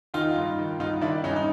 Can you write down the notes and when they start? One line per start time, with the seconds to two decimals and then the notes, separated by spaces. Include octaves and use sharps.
0.14 D#3 D#4 F4
0.36 G2
0.58 D#3
0.80 G2 D#4 F4
1.01 D#3 D4 E4
1.24 G2 C#4 D#4
1.36 D#4